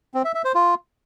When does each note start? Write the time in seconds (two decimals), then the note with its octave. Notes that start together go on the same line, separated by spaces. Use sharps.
0.14 C4
0.24 E5
0.35 E5
0.45 C5
0.55 F4